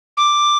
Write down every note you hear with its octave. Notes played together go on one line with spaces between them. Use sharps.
D6